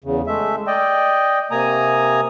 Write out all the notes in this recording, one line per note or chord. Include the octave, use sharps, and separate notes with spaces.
E2 C#3
G#3 A3 E5
D5 D#5 G5
C3 A#3 G#5 A#5 D#6